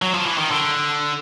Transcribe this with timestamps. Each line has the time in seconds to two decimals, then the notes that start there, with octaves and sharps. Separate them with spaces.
0.02 F#3
0.14 F3
0.26 E3
0.38 D#3
0.50 D3